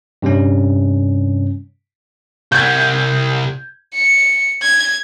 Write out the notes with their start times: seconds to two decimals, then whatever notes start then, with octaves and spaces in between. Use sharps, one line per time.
0.22 G2 C3 G3 C#4
2.52 C2 G6 G#6
3.95 C#7
4.62 G#6